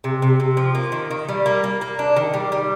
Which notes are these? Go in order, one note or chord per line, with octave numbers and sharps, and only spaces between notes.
C3
C3
C3
F3
A#3
D#3
D#3
G3
A#3
A#3
A#3
D4
D#3
G3
G3